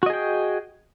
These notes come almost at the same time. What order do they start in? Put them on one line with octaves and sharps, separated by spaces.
F#4 D#5 G#4 G5